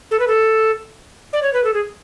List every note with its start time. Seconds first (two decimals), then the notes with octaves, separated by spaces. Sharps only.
0.11 A4
0.19 B4
0.27 A4
1.33 D5
1.42 C#5
1.53 B4
1.64 A4
1.74 G#4